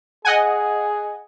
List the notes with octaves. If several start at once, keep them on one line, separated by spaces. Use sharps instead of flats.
G#4 D#5 F#5 G#5